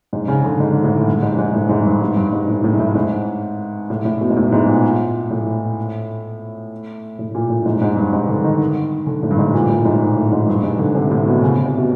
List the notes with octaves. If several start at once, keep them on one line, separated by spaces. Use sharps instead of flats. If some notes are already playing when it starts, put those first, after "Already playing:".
G#2
C#3
D3
G#2
A2
G2
G#2
G#2
A2
G#2
G2
G#2
G2
G#2
A2
A2
G#2
A2
G#2
A2
A2
B2
G#2
A2
G#2
A#2
A2
A2
A#2
A2
G#2
G#2
G2
G#2
D3
D#3
D3
A2
G2
G#2
A#2
A2
G#2
A#2
A2
G#2
G2
G#2
D3
C3
A2
B2
C#3
C3
B2